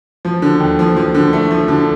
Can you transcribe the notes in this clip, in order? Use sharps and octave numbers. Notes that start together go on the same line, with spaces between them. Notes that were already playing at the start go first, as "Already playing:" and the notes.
F3
D3
D#2
F3
F3
D3
A3
F3
D3